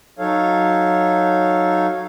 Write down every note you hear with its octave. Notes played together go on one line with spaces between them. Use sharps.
F#3 D#4 A4 C#5 F5